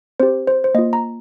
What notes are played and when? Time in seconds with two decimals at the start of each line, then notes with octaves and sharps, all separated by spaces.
0.20 C4 G4 C5
0.47 C5
0.64 C5
0.74 A#3 D#5
0.79 F4
0.93 A#5